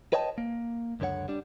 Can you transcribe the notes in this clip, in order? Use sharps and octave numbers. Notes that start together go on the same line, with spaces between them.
B4 C#5 D#5 G5 A5
A#3
C#2 F#2 D3 C#5 F#5
G3 D4